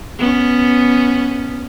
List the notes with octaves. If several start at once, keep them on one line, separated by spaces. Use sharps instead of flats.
B3 C#4